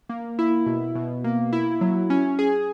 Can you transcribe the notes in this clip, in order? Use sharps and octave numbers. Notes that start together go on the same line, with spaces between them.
A#3
E4
B2
B2
A#3
E4
F#3
C#4
G#4